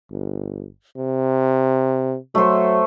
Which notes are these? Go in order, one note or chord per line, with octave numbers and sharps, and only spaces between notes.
G1
C3
F#3 A3 C5